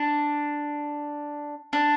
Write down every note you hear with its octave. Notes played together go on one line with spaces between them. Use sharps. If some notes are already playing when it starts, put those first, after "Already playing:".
Already playing: D4
D4